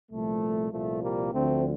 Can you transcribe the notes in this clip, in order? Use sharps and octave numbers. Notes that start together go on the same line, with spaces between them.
C2 A#2 F3 A3
C2 A#2 F3 A3
G3 A#3
D2 D3 F3 A3 C4